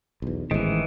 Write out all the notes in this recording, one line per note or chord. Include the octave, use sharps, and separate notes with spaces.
B1 E2
A1 G#2 D#3 E3